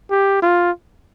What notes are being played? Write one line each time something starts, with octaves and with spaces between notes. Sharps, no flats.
G4
F4